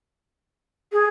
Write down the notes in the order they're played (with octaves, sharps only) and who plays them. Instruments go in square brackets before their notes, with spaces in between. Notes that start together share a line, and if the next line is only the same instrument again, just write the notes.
[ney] G#4